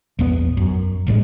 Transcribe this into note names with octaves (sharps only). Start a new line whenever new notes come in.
A#1 E2 B3
F#2
A1 A2 G3 G#3